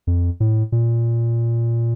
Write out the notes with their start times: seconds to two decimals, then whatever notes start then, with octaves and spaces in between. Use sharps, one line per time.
0.07 F2
0.40 A2
0.72 A#2